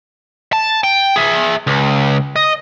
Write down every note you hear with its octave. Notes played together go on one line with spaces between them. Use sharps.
A5
G5
G#4 E5
C#2
D#5